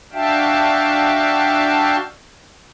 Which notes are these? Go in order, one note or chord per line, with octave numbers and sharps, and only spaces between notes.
D4 F#4 E5 F5 G5 A5